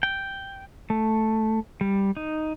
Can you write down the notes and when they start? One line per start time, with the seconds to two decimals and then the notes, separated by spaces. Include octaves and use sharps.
0.03 G5
0.90 A3
1.81 G3
2.17 D#4